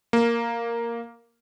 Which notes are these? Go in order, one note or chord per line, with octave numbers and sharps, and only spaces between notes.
A#3